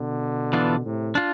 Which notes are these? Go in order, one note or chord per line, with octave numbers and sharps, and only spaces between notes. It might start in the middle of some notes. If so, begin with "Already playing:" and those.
Already playing: B2 D3
E3 B3 D4 F4
A2 C3
D4 F4